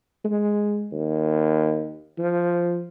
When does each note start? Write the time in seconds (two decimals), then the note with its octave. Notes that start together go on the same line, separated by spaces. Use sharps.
0.25 G#3
0.92 D#2
2.18 F3